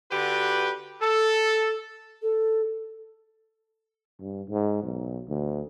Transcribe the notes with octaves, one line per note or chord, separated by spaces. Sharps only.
D3 F#4 G4 B4
A4
A4
G2
G#2
B1
D2